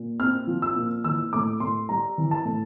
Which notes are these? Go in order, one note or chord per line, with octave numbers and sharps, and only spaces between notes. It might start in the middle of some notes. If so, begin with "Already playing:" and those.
Already playing: A#2
C4 F6
F3
E6
A#2
E3 E6
A2 D6
A2 C6
G3 A#5
E3
A5
A2